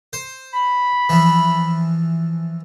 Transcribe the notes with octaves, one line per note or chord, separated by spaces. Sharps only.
C5
B5
E3 F3